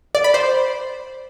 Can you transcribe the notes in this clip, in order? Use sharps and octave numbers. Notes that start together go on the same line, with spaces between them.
D5
B5
C5